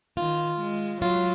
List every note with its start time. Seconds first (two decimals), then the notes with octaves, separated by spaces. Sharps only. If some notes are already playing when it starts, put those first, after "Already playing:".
0.17 D#3 F4
0.60 G#3
1.02 F#3 F4